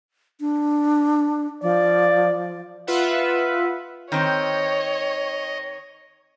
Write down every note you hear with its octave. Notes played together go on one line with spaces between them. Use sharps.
D4
F3 D5
F4 B4 E5 F#5
D#3 C4 C#5 D#5